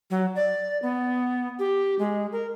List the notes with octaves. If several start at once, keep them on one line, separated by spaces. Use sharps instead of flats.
F#3
D5
B3
G4
G#3
A#4